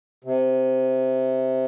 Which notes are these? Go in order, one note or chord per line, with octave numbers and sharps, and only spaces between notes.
C3